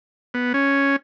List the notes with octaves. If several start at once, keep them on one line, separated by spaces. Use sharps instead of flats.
B3
C#4